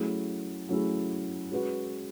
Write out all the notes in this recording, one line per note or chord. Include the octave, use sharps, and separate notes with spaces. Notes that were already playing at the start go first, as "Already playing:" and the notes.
Already playing: F#3 A3 C#4 E4 G#4
F#3 A3 C#4 E4 G#4
G#3 C#4 F#4 B4